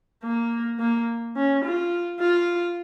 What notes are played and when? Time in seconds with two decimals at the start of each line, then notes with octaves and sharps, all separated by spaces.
0.24 A#3
0.80 A#3
1.36 C#4
1.64 F4
2.20 F4